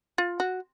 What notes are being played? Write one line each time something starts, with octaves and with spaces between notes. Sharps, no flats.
F4
F#4